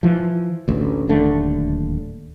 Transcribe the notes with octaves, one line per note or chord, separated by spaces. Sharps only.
E3 F3
A1 D2
D1 D#2 D3 A3